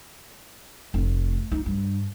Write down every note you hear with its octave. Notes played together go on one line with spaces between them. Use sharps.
F1
D#4
G2